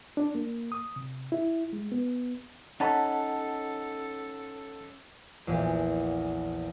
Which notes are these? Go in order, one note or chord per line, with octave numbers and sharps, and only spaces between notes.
D4
A#3
D#6
C3
E4
G#3
B3
C#4 D#4 A4 F#5 A5 B5
A#1 E2